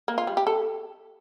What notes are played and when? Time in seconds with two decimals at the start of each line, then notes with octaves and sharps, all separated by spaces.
0.08 A#3
0.18 F4
0.27 G3
0.37 G4
0.47 A4